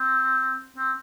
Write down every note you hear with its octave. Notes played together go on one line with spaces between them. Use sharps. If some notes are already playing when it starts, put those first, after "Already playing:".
Already playing: C4
C4